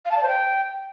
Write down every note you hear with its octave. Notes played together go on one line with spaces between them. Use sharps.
F5
A5
D5
C5
G5